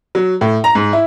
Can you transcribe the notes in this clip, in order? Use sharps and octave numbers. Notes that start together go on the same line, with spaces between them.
F#3
A2
A#5
G#2
E4